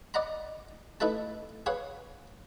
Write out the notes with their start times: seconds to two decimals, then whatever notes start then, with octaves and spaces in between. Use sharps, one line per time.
0.14 D5 D#5 F#5 A#5 B5
1.00 A3 D#4 E4 A4 B4 A5
1.66 G#4 B4 C#5 F5 F#5